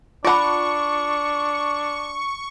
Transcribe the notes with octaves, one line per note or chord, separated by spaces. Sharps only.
D4 F4 D5 F#5 A5 B5 C#6